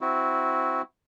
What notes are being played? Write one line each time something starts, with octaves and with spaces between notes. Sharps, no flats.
C4 E4 F#4